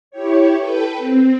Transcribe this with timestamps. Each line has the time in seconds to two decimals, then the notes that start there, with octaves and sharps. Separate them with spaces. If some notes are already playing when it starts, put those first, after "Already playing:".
0.11 E4 G4 C#5
0.58 A4 B4 G5
0.97 C4